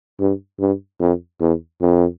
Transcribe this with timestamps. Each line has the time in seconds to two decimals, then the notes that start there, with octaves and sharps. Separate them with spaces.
0.20 G2
0.60 G2
1.00 F2
1.40 E2
1.81 F2